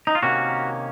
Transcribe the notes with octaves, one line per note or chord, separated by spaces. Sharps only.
D#4
F4
C3 D#3 A#3 C#4 F#4